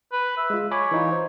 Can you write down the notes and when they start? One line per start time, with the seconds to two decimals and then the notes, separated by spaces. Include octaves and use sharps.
0.12 B4
0.37 E5
0.50 G#3 F4
0.71 C#5 G#5 B5 D6
0.91 E3 D#4 F4
1.11 C5